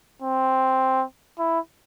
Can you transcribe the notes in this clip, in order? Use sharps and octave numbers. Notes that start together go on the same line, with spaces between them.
C4
E4